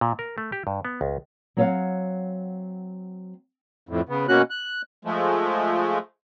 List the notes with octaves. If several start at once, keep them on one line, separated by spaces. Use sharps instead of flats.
A#2
A#4
A3
G4
G2
B3
C#2
F#3 C4 C#5 D#5 F5 F#5
F2 A2
C#3 B3
B2 A#3 C#4 F#4 F#6
F#6
F3 G#3 A3